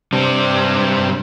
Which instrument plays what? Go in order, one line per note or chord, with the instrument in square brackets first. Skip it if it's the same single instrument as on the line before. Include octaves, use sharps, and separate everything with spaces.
[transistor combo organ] C3 [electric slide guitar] G3 D4